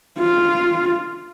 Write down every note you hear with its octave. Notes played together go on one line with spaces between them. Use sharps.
F4